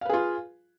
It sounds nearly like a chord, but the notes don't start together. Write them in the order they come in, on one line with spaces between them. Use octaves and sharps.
F5 B4 G#4 F4